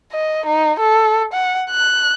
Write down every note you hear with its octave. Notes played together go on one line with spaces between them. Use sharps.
D#5
D#4
A4
F#5
F#6